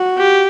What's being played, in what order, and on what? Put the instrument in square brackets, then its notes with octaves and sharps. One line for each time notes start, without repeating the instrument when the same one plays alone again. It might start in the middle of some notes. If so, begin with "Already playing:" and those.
Already playing: [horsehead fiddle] F#4
[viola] G4